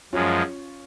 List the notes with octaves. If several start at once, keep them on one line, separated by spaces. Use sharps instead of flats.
F#2 F3 G#3 C#4 F4